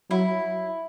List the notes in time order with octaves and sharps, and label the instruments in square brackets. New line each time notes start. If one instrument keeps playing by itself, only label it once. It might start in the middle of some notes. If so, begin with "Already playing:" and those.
[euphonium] F#3 [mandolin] E4